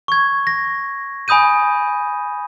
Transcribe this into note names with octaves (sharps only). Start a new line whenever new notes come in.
C#6 G#6
A#6
G#5 B5 D#6 G6 D#7